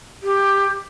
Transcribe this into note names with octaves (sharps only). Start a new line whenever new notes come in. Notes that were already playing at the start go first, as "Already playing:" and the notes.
G4